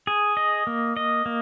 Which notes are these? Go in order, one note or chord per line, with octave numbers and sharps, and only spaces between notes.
G#4
D#5
A#3
D#5
A#3